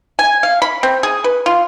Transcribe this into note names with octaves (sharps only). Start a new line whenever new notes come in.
G#5
F5
B5
C4
G#4
B4
F4